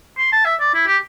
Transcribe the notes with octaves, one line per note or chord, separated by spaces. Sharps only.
C6
A5
E5
D5
E4
G4